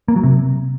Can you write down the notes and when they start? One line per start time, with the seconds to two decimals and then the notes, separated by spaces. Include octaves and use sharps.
0.08 A#3
0.16 F#3
0.23 C3